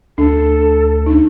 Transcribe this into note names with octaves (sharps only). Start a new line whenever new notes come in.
D2 D4 A4
D4 D#4